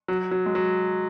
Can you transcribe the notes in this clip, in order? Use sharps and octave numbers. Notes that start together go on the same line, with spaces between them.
F#3
F#3
G#3
F#3